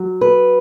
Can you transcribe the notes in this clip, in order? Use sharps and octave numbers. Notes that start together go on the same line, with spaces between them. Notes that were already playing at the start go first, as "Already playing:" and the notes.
Already playing: F#3
B4